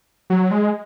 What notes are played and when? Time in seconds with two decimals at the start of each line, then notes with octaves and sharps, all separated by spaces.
0.30 F#3
0.51 G#3